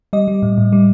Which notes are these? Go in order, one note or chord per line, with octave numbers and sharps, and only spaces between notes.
G3 D#5
G3
A2
A2
G3